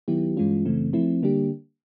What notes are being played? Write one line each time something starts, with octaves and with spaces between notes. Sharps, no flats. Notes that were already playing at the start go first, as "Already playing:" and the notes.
D#3 F#3 B3 E4 G4
G2 E3 G#3 C#4 F4
F#2 C#3 E3 A3 C4
F3 A3 C4 E4
D3 G3 A#3 D4 G4